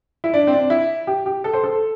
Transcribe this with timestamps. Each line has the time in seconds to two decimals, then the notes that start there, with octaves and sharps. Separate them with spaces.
0.24 E4
0.34 D4
0.47 C4
0.53 D4
0.70 E4
1.07 G4
1.26 G4
1.44 A4
1.54 C5
1.64 A4